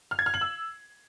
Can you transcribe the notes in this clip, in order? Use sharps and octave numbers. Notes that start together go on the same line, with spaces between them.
F6
G#6
F6
F#7
E6